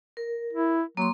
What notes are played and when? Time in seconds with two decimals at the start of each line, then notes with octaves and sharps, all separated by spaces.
0.17 A#4
0.53 E4
0.97 F#3 A#3 C6